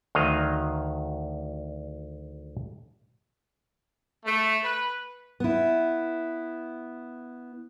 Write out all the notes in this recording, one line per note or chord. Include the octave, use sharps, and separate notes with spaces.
D2 D#3 F#3 D#5 F5
A3
B4
B3 E4